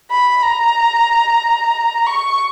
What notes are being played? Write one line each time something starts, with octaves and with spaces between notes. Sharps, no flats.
B5
A#5
C#6